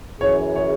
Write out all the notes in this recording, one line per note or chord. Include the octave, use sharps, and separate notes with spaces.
F#2 E3 C#4 G#4 C#5
C#5